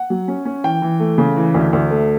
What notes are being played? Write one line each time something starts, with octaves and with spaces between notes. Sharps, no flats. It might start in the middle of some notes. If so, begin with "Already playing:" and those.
Already playing: F#5
F#3
C#4
C#4
E3 G5
E3
A3
C#3
E3
D2
D2
A3